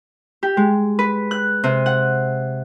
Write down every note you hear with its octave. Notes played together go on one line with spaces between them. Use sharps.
G4
G#3
B4
F#6
C3
F#5